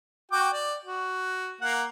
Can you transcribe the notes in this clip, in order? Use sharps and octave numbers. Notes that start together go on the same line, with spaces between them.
F#4 G5 D6
D5
F#4
A#3 F#5